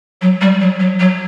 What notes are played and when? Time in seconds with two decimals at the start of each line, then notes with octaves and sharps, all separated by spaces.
0.22 F#3
0.41 G3
0.61 F#3
0.80 F#3
1.00 F#3